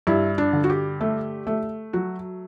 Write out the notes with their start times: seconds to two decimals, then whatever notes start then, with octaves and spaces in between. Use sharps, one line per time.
0.07 G2 E4
0.38 D4
0.53 D3
0.64 F#4
0.70 G4
1.01 A3
1.47 A3
1.93 F#3 F#4